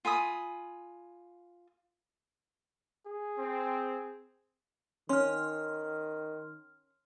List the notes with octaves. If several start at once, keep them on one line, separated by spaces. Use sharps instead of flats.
F4 G#5 B5 D#6
G#4
C4
D#3 C#4 C6 F6